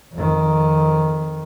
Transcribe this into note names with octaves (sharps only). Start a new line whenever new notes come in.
F2 D#3